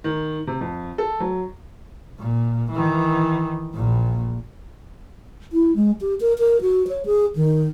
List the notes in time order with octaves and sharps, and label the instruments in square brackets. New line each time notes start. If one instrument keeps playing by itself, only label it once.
[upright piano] D#3
C3
F2
A4
F#3
[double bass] A#2
D#3 E3
A#1 A#2
[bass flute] E4
G#3
G4
A#4
A#4
F#4
C#5
G#4
D#3